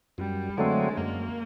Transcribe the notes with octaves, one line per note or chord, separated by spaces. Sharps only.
F#2 G3
D3 F#3 G#3 A3 C4
F#2 A#3